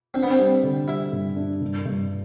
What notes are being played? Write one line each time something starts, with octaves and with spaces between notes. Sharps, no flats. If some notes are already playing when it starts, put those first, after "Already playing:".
C4 D4
B3
C4
G3
D3
G3 E4
G2
D4
G2
G2